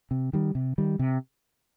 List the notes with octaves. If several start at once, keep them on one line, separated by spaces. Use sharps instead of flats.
C3
D#3 G3
C3
D#3 G3
C3